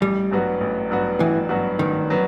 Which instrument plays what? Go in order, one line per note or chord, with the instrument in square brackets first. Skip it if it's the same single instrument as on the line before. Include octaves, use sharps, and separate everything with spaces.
[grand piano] A1 [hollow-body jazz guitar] G3
[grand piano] G2 F#3 B3 F#4
A1
G2 F#3 B3 F#4
[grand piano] A1 [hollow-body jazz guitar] E3
[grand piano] G2 F#3 B3 F#4
[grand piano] A1 [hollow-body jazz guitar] D#3
[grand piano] F#3 B3